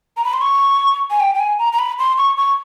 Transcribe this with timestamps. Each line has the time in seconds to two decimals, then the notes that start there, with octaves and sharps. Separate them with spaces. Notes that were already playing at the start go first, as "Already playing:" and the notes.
0.17 A#5
0.25 B5
0.33 C6
0.41 C#6
1.11 G#5
1.20 G5
1.35 G5
1.39 G#5
1.59 A#5
1.73 A#5
1.79 B5
1.99 C6
2.18 C#6
2.37 C#6